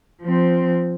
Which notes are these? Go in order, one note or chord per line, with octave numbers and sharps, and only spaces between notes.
F3 C4